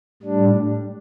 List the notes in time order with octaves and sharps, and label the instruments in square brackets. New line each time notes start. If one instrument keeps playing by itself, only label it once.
[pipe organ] A2 G3 D4